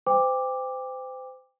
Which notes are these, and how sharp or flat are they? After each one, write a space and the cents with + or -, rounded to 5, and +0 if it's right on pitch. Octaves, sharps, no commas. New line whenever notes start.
C5 -35 G5 +30 D6 +0